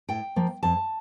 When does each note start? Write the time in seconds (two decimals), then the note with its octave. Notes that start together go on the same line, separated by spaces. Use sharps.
0.09 A2 G5
0.36 F3 A#3
0.63 F2 A5